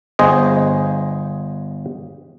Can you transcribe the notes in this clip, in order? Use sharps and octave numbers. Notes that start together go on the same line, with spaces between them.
G1 G#4 C5 D#5